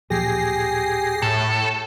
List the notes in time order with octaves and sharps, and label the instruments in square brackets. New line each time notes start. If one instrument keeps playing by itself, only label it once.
[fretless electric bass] D1 A#2 F3 [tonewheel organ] G4 G#4 [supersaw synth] A#6 C7
[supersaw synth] A2 [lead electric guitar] A4